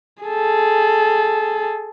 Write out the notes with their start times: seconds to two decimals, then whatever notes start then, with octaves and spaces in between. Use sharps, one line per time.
0.24 G#4 A4